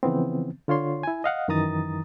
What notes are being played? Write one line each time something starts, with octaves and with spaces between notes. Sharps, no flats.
C#3 E3 F3 B3 C4
D3 F4 C#5 C6
E4 G#5
D#5 F5 F#5
F#2 D#3 E3 A#5 D#6 A6